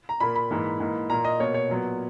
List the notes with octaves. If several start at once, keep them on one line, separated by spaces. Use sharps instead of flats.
A#5
A#2 A#3 B5
B5
G#2 E3 A#3
G#2 E3 A#3
A#2 A#3 A#5
D#5
B2 A#3 C#5
C#5
A#2 F#3 B3